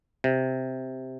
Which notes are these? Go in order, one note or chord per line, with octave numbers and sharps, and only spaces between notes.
C3